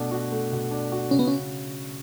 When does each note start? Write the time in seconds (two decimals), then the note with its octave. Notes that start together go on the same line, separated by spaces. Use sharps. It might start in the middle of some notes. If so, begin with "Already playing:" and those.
Already playing: B2 A3 D4
0.12 F#4
0.32 A3
0.52 B2
0.71 D4
0.92 F#4
1.11 C#3 C#4
1.19 B3
1.27 C#4